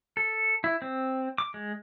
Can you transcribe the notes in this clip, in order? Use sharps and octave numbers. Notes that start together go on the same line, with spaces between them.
A4
E4
C4
D6
G#3